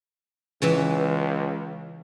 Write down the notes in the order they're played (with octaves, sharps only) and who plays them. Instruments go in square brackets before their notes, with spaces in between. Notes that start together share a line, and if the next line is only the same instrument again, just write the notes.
[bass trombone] C#2 [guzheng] C#3 E3 E5